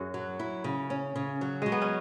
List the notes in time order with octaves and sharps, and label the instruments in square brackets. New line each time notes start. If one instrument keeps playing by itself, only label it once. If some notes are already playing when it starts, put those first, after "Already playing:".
Already playing: [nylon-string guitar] F#2 [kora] F#4 G#4
[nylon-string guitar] F#3
E4
C#3
C#4
C#3
F#3
[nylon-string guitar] F#3 [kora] G#3
[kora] B3
C#4